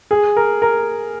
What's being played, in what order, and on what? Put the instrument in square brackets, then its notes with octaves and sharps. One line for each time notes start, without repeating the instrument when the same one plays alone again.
[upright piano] G#4
A#4
A#4